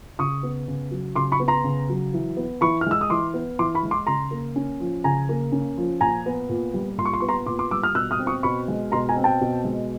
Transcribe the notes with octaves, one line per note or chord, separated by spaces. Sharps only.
C#3 C#6 D#6
B3
C#3
F#3
C#3 C6 D6
B5 C#6
B3
A#5 C6
C#3
F#3
E3
B3
E3 B5 C#6
F6
G#3 E6
D#6
E3 C6 D6
B3
E3 C6 D6
B5 C#6
G#3
C6 D6
C#3 A#5 C6
A#3
C#4
F3
C#3 G#5 A#5
A#3
C#4
F3
A#2 G#5 A#5
B3
A#2
G3
A#2 C6
C#6
C6
B3 C#6
A#5 C6
A#2 C6 D6
C6 D6
G3 D6 E6
D#6 F6
B2 E6 F#6
D#6 F6
C4
C#6 D#6
B2 B5 C#6
G#3
B2 A#5 C6
G#5 A#5
C4
G5 A5
B2
G#3